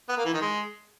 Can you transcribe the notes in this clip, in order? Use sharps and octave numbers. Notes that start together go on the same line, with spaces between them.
B3
A#3
E3
D#3
G#3